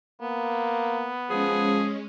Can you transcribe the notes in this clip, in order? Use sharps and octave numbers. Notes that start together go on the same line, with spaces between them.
A#3 B3
F3 G#3 C#4 G#4